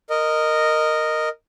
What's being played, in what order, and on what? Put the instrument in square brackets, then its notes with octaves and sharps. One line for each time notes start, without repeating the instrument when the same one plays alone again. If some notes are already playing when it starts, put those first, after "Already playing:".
[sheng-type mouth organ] A#4 D#5